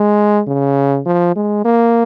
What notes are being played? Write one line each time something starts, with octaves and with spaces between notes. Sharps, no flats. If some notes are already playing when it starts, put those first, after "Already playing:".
Already playing: G#3
C#3
F3
G#3
A#3